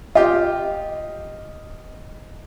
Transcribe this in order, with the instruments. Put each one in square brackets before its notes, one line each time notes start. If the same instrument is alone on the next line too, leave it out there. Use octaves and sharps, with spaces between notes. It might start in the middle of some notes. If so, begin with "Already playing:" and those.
[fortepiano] F4 G4 [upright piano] D#5